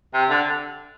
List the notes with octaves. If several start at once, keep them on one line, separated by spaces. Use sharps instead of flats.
C3
D3